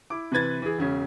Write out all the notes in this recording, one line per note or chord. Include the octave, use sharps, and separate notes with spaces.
E4 D6
C3 E3 B4 G#6 A6
E3 G#4
E1 C#3 C#4